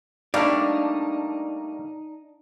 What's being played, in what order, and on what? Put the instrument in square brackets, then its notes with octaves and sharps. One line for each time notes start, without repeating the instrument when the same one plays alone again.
[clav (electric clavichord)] G3 A3 A#3 [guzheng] D4 F5 [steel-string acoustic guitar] D#4 [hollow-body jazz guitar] D5